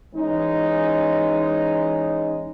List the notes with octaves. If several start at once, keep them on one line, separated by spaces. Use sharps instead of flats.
E3 G#3 C#4 D#4